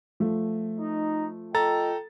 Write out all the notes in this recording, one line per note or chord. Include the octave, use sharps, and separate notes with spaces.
F3 A3
D#4
F4 A4 D#5 G5 A#5 A6